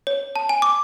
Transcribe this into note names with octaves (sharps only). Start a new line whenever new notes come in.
C#5
A5
G#5
D6